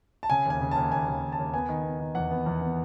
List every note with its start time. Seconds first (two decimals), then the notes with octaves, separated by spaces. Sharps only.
0.23 A5
0.30 C#3 G#5
0.46 D#2 G#5
0.61 C#3
0.71 D#2 A5
0.92 D#2 G#5
1.08 D#2
1.22 D#2
1.32 A5
1.39 D#2
1.53 B3 G#5
1.69 D#3
1.84 B3
2.00 D#3
2.15 E2 F#5
2.31 B3
2.46 E2
2.61 B3